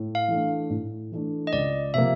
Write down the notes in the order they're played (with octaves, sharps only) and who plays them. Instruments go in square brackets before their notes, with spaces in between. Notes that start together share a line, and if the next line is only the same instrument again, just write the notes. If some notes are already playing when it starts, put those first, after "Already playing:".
Already playing: [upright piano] A2
[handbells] F5
[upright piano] E3 A3 D4
A2
E3 A3 D4
[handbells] D#5
[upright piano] C#2 [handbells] D5
[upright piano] C3 F3 A#3 [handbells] E5